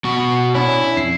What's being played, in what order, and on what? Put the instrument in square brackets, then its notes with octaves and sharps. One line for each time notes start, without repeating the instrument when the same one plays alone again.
[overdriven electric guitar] B2 F#4
[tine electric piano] C#4 D4 [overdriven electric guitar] E4
[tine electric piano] F2 C7